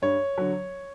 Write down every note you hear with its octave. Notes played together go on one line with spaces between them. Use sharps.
G2 C#5
D3 F#3